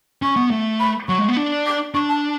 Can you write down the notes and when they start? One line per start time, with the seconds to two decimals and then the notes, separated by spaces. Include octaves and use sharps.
0.22 C#4 C#6
0.36 B3
0.51 A3
0.80 B5
1.08 F#3 C#6
1.19 G#3
1.28 B3
1.37 D4
1.66 D6
1.94 D4 C#6
2.09 A5